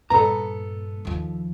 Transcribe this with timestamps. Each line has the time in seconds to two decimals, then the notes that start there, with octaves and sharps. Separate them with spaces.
0.10 G2 A#2 B3 A4 A#5
1.05 D#2 F3